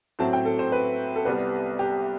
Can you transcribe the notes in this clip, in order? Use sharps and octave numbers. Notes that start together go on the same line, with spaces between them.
A2 F#3 C4 A5
G5
A4
C5
B4
A4
C2 C3 G3 B3 B4
G4